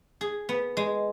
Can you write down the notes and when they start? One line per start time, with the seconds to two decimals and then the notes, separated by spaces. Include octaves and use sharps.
0.21 G#4
0.49 B3
0.77 G#3